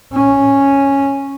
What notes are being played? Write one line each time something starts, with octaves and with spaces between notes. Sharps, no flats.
C#4